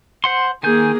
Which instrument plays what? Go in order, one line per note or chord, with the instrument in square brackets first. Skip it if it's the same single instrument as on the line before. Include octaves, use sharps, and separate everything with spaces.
[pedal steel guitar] C5 F#5 C6
[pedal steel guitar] D#3 G#5 G6 [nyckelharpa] A#3 G#4